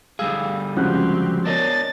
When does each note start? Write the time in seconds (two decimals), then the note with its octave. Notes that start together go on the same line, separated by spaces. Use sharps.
0.19 D3 G3 G#4 F5 E6
0.77 C#3 F3 G#3 C4 F#4 G4 F#6
1.45 B3 D4 A#4 C#5 D#5 A6